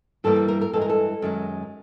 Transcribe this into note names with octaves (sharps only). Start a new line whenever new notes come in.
G2 E3 G3 A#3 A4
A4
A#4
A#4
G2 E3 G#3 A4
A#4
A4
F#2 D#3 G#3